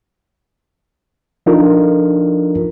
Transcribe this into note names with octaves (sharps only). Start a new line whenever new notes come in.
F3 D4 D#4 F4 A4 A#4